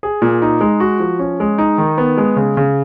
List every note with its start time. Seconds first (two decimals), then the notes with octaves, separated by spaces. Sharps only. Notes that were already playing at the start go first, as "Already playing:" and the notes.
0.03 G#4
0.22 A#2
0.42 D#4
0.61 G#3
0.80 F#4
1.00 F3
1.19 C#4
1.40 G#3
1.58 D#4
1.78 D#3
1.98 B3
2.17 G#3
2.37 C#3
2.57 C#3